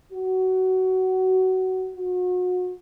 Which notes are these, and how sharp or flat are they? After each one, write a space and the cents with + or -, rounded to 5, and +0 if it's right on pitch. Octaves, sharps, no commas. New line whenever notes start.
F#4 +20
F#4 -35